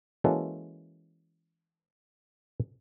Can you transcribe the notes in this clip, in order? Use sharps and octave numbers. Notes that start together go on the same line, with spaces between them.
E3 G#3 A#3 C#4 F#4 A4